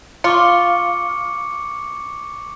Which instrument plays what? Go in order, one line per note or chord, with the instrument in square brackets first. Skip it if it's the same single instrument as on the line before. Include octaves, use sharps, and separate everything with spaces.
[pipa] F4 [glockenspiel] C#6 D6 C#7